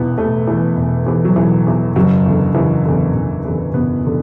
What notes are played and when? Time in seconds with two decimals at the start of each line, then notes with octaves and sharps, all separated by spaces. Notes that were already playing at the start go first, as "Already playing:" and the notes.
Already playing: E1 E2 E3 B3
0.18 E1 A3
0.47 E2 E3
0.77 E1
1.06 E2 E3
1.25 F#3
1.36 E1 E3
1.67 E2 E3
1.96 F#1 F#3
2.26 E2 D3
2.54 F#1 E3
2.85 E2 D3
3.14 F#1
3.44 E2 D3
3.74 F#1 B3
4.06 D3